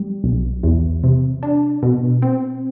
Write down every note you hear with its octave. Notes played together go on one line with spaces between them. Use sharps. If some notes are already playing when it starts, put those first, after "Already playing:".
Already playing: G3
B1
E2
C3
D4
B2
C4